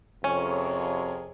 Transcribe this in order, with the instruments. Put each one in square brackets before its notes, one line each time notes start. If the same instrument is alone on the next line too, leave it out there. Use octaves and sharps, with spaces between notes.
[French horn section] F2 C3 [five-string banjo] C#4 [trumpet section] G#4 A#4 C#5